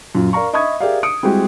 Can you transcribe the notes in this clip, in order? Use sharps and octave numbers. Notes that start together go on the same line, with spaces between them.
F#2 A#2
A#4 D5 F5 A#5 C#6
D#5 E5 B5 C#6 D#6 G#6
G4 G#4 A#4 D5 E5 F5
D#6 C#7 D7
G3 G#3 C4 E4 F#4 G4